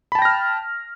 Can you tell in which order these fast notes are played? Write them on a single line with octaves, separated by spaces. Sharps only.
B5 A5 G5 A#6 F6